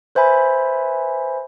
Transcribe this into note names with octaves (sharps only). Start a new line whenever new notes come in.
B4 C5 E5 G#5 B5